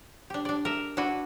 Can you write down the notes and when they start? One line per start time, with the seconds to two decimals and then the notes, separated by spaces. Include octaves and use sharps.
0.30 D4 G4
0.45 D4 D5
0.65 A#4 E5
0.97 D4 E4 F#4 B4